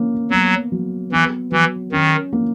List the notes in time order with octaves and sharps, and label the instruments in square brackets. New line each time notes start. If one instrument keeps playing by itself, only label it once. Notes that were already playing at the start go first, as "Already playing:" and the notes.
Already playing: [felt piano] A#3 C#4
[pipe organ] F#3 [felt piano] B3
[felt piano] F#3
[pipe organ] E3 [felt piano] B3
[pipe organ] E3 [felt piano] F#3
[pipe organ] D#3 [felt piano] C#4
[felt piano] A#3